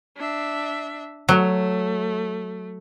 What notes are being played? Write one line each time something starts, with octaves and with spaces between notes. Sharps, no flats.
D4 E5
F#3 A3